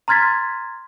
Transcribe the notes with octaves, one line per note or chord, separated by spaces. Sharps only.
A#5 C6 F6 G#6 A6 B6